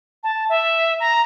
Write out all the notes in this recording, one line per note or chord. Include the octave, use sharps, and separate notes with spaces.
A5
E5
A#5